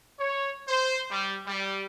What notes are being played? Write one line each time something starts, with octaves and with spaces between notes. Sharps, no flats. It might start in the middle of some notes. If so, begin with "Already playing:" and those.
C#5
C5
G3
G3